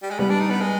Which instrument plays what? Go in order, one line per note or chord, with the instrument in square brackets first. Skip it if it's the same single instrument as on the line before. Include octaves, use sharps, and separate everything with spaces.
[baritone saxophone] G3
G#3
[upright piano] G3 [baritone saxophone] B3
[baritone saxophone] D4
D#4
B3
G#3